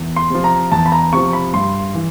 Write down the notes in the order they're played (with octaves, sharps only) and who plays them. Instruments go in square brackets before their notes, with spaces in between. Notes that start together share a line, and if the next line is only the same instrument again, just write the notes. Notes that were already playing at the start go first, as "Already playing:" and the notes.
Already playing: [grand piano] E2
C6
C3 F3
A#5
E2 A5
B5
A#5
C3 F3 C#6
B5
G2 C6
E3